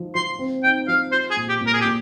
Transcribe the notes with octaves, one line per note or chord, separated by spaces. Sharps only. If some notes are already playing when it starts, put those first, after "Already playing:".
Already playing: F3 D#4
F3 C6
C4
D#4 G5
F3 F5
F4 C5
G#4
A#2
G4
A#2
A#4
G#4
G4
A#2